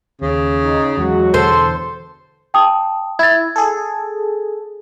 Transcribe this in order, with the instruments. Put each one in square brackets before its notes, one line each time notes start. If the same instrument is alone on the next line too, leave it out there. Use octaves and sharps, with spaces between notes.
[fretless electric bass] D#2 [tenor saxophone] C#3
[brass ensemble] D#4
[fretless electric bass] E2 F3 [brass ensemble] F#3 G#3 F#4
[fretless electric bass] E2 B2 D3 [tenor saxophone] A4 [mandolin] C5
[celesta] G5 A5 D#6
[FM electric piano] E4 [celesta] G#6 A6
[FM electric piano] G#4 A4